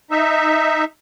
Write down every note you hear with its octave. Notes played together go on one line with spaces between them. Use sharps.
D#4 E5